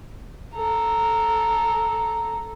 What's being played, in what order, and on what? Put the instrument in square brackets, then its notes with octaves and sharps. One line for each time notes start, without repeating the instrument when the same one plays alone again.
[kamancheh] A4 A#5